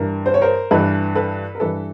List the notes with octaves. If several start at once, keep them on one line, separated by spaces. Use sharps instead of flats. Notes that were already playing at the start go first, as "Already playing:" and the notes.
Already playing: G2 E3 A#4
C5
C#5
A#4 C5
G2 E3 A4 B4
A4 B4
A#4
G2 E3 A4 B4